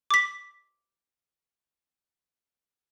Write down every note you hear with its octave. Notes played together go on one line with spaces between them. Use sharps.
D6 B6